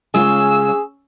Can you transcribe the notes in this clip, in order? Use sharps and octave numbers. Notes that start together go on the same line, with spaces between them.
C#3 G#3 C#4 F4 G#4 E6